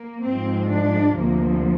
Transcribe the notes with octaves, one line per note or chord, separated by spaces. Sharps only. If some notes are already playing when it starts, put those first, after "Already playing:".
Already playing: A#3
G#2 F3 G#3 C4
D4
D2 C3 F3 A#3